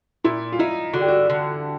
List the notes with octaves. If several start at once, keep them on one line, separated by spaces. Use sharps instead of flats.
A#2 E4
F4
D#4 E4
D3 F#4
G4
F#4
D3